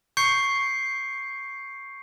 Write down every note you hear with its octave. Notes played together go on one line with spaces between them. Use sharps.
C#6 G6 C7 C#7